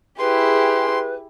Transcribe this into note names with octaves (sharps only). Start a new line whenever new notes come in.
E4 G4 G#4 B4 C6